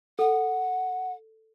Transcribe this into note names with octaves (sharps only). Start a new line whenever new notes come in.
A4 F#5